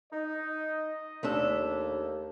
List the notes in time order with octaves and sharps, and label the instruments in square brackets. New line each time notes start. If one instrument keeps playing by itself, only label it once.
[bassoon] D#4 [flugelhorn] D#5
[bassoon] D#2 [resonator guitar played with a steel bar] A3 D4 A4